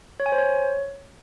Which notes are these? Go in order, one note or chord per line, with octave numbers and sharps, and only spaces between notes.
C#5
G#5
C5
C#5